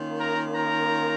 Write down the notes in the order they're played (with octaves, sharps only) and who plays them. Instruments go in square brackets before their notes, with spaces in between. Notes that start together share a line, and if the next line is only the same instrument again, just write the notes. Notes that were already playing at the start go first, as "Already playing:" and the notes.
Already playing: [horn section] D#3 A#3 C#4 F4
A#4 A#5
A#4 A#5